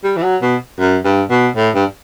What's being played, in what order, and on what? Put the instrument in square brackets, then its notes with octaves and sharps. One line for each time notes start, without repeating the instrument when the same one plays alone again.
[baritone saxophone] G3
E3
F#3
B2
F#2
G2
B2
A2
G2